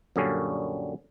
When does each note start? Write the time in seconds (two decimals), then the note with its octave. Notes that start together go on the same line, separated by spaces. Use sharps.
0.16 F#2 A#2 D3 G3 C#4